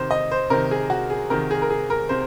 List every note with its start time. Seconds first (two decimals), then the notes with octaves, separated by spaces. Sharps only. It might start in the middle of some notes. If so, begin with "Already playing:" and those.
Already playing: C3 D#3 C5
0.11 D#5
0.32 C5
0.50 C3 D#3 A#4
0.71 G#4
0.90 F#4
1.10 G#4
1.30 C3 D#3 A#4
1.51 G#4
1.62 A#4
1.70 G#4
1.90 A#4
2.09 C3 C5